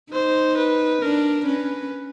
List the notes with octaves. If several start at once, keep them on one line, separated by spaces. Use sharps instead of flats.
D#4 C5
B4
D4 A#4
C#4 B4